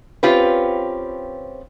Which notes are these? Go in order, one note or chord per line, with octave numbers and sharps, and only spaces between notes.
C4 C#4 F4 G4 B4